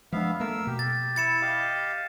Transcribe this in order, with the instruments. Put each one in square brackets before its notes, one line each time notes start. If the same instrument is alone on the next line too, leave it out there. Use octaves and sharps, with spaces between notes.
[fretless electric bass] F3 G#3 D4 [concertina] B3 E5 F5
[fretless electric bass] A3 A#3 [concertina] A#4 E6
[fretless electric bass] B2 [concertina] G4
[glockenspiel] A6
[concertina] E4 [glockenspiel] A6 C#7 E7
[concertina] G4 D#5 F5